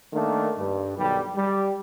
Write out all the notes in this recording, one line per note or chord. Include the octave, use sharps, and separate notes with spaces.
D#3 A3 A#3 D4
G2
B1 D#3 G3
G3